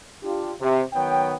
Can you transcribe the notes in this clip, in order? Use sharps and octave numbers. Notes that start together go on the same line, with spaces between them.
D4 F4 G4
C3
D#3 F#3 B3 C#5 G5